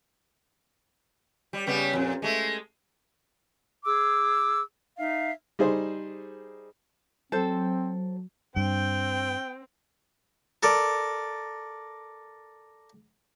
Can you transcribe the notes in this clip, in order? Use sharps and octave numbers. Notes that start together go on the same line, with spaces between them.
G3
C#3 G3 B3
F2 A#2
G#3 A3
G#4 D6 E6
D#4 E5 F5
G3 D#4 G#4 C5
F#3 C4 A4 C5
G2 C4 G5
A4 A#4 D5